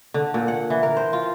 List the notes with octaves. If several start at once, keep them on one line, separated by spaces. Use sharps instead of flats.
D3
A#2
F#5
E3
A#4
C5
F4